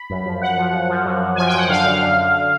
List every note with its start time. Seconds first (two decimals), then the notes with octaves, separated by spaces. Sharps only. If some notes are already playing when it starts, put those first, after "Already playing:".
Already playing: B5
0.10 F#2
0.26 F3
0.42 F#2 F#5
0.58 F3
0.73 F#2
0.89 F3
1.06 F#2
1.22 F#2
1.36 F3 G#5
1.47 G5
1.54 F#2 F#5
1.69 D3 F5
1.86 F#2
2.02 D3
2.17 D3